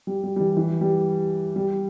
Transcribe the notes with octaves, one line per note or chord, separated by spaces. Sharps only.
G3
G3
G3
E3
E3
G3
G3